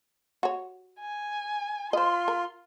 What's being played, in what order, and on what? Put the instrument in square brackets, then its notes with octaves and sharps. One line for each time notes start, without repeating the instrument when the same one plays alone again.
[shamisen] F#4 C#5
[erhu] G#5
[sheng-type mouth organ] F4 [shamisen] C5 D#5 [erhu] C6
[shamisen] A#4